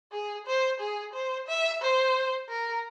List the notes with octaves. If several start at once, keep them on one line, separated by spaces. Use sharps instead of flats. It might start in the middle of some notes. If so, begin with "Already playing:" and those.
G#4
C5
G#4
C5
E5
C5
A#4